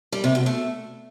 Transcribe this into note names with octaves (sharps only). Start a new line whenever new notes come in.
G3
C3
B2
A3